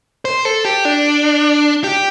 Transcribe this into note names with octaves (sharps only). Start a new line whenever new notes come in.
C5
A4
G4
D4
G4